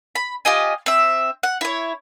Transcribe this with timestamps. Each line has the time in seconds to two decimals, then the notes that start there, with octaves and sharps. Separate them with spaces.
0.15 B5
0.45 F4 G4 D#5 G#5
0.86 C4 E5
1.43 F#5
1.61 E4 C#5